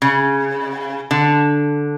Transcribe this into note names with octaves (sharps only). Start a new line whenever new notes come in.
C#3
D3